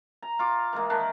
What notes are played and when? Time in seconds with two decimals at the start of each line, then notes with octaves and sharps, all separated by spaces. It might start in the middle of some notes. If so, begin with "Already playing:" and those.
0.22 A#5
0.39 F4 D6
0.73 E3 G#3 A#3
0.90 D#3 D4